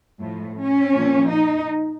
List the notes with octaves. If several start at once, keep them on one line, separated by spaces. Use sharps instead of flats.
A2 F3
C#4
A#2 F3
D#4